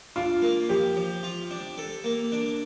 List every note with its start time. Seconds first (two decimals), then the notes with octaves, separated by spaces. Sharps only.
0.16 D4 F4
0.42 A#3
0.69 F3 G4
0.96 F3
1.23 F4
1.51 D4
1.78 A4
2.04 A#3
2.32 D4